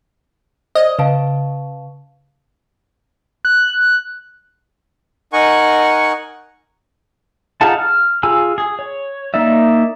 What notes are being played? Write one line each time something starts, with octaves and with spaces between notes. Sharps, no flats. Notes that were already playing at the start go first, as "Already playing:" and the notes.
C5 D5 D#5
C#3 B4 F5 A5
F#6
D#4 A#4 F#5 G#5 C#6
D#4 F4 G#4 F#5 A5
F6
F4 G#4 G#5 E6
G#4
C#5
A#3 D#4 D5 E5